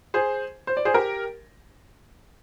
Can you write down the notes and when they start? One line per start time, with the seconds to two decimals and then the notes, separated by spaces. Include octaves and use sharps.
0.14 G#4 C5
0.67 C5
0.77 D5
0.85 G#4 C5
0.94 G4 A#4